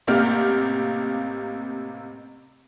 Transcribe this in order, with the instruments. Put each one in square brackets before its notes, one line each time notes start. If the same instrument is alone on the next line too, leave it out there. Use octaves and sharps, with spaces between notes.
[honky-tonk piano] A1 C3 A#3 G4 F6